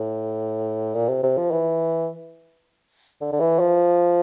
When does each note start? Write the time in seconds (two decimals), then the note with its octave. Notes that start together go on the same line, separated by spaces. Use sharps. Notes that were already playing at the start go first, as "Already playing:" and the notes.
Already playing: A2
0.95 A#2
1.09 C3
1.23 C3
1.37 F3
1.51 E3
3.21 D3
3.32 D3
3.40 E3
3.59 F3